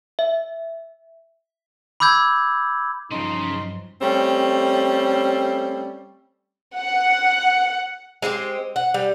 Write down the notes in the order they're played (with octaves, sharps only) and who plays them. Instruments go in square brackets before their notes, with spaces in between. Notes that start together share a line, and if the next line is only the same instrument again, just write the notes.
[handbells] E5
[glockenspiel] B5 D6 E6 G6 G#6
[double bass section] G2 F3 F#3 [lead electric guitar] C#3 [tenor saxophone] D#4 [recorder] C6
[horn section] G3 A3 C4 C#4
[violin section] F#5
[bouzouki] G#3 C4 E4 G4
F#5
G3